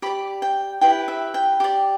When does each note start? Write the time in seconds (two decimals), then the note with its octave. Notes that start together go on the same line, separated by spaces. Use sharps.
0.02 G4 D5 B5
0.42 G5
0.81 E4 G4 B4 G5
1.08 E5
1.34 G5
1.60 G4 D5